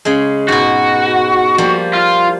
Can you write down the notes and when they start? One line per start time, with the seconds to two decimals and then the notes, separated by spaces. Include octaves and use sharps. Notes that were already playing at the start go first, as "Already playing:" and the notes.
0.05 C#3 G#3
0.48 G#2 B2 F#4
1.58 F3 G3 A#3
1.94 F4